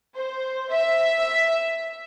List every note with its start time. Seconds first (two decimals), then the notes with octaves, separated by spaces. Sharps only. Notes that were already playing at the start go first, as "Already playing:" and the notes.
0.14 C5
0.71 E5